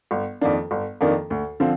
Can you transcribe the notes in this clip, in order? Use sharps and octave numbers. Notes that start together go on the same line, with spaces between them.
G1
F2 D#3 A#3 D4
G1
F2 D#3 A#3 D4
D2
D3 F3 C4